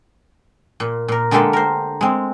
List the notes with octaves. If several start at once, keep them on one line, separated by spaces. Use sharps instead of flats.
A#2
A#2 A#4
D3 G#3 A#3 G4 A4 B4
A#4 C5
G#3 C4